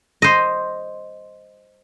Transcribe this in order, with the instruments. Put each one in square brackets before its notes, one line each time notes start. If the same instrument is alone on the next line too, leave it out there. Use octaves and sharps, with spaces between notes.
[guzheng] C5 D#5